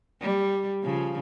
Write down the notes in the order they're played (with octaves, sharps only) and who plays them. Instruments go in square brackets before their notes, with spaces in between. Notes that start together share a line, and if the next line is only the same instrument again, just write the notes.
[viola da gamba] G3
C#3 F3